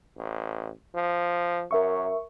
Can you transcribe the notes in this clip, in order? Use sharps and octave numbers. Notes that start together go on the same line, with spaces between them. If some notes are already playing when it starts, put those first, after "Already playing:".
A1
F3
F#2 A#4 E5 C#6